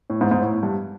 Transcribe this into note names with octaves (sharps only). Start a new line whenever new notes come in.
A2
G#2
G#2
A2
G2